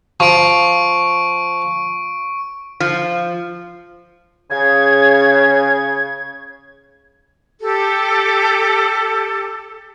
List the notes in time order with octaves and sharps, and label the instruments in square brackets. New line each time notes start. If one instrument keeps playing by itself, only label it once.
[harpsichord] F3 [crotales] C#6 D7
[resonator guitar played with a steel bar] F3
[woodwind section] C#3 [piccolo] G#6
[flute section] G4 A4